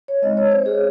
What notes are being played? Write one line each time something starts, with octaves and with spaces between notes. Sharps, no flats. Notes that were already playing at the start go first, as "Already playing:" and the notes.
C#5
G#3 C4 D#4 D#5
C#5
C5
G#4